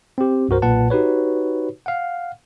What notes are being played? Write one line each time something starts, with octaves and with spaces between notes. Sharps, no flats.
C4 G4
C2 G2 F#4 A#4 C5
B1 A#2 B4 F#5 A5
D#4 F#4 G4 B4 C#5
F5 F#5